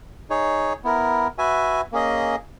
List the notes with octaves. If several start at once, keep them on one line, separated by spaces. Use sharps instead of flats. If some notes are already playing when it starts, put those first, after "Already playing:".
D#4 G#4 C#5
B3 E4 A#4
F#4 B4 E5 G#5
A#3 C#4 G#4 D#5